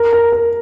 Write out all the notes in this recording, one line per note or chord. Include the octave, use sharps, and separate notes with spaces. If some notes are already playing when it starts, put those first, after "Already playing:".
Already playing: A#4
A#4
A#4